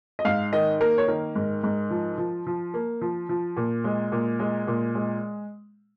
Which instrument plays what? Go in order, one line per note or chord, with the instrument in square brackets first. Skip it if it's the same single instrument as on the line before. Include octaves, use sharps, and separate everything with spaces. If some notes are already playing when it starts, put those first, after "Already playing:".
[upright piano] D#5
G#2 F5
D#3 D#5
A#3 A#4
C#5
D#3 A#4
G#2
G#2
F3
F3
F3
A#3
F3
F3
A#2
G#3
A#2
G#3
A#2
G#3